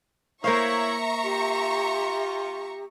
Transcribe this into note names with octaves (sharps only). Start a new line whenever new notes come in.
A#3 E4 C5 C#5 E5 F5 A#5 C#6
F4 G4